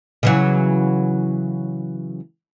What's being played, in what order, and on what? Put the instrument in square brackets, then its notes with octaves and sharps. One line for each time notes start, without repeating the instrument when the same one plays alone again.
[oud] C#3 E3 F#3